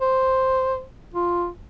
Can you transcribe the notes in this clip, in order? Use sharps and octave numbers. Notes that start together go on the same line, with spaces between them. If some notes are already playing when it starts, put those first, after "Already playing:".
C5
F4